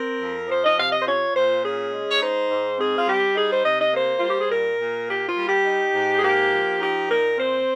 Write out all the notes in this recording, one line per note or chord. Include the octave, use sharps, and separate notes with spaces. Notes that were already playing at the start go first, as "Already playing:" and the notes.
Already playing: C4 A#4
F2
F3 C5
D#5
C3 F5
D#5
C5
F4 C#5
A#2 C5
C#4 G#4
G#3
C#5
D#4 C5
G#2
C4 G#4
F4
G3 G4
D#4 G#4
C5
C3 D#5
D#5
A#3 C5
G3 F4
G4
G#4
A#2 A#4
A#2
A#3 G4
F4
G3
G4
D#4
G#2
G#4
A#3 G4
F3
D#4 G4
A#2 A#4
C4 C5